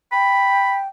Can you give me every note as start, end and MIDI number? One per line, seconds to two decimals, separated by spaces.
0.13 0.88 79
0.13 0.77 83